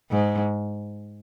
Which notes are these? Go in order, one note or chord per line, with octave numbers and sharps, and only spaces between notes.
G#2